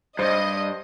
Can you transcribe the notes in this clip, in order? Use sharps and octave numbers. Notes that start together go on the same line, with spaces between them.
G2 C5 D#5